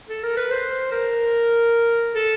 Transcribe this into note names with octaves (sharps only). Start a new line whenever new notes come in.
A4
A#4
B4
C5
A#4
A4